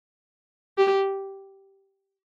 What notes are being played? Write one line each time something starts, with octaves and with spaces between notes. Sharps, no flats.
G4